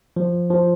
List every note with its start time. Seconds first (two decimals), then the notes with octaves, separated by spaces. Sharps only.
0.16 F3
0.50 F3